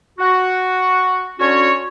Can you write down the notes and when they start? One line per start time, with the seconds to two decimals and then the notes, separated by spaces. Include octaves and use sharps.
0.19 F#4
1.39 D3 C#4 F#4 C#5